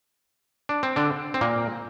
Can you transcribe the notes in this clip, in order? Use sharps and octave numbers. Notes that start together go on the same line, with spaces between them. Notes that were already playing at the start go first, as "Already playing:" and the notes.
D4
C4
D3 D4
C4
A#2 A#3